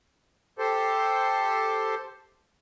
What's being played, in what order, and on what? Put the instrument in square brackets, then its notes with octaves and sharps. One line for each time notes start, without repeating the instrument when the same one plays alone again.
[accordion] G4 A4 C5